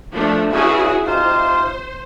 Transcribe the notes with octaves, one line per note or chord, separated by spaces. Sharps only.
F3 A3 D4
G2 C#3 E4 F#4 G#4
C3 D#4 F4 C5